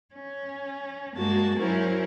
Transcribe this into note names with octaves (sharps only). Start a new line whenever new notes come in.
C#4
G2 G#3 A#3 F#4 A5
F#3 C#4 E4 F#4 A#4 C5